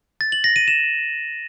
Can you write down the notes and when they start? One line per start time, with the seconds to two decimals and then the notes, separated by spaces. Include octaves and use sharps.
0.21 A6
0.32 F#7
0.44 A#6
0.56 D#7
0.68 E7